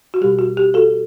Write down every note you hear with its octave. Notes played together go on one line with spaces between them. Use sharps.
F#4
B2 G3 G4
F#4
G4
F#4 A4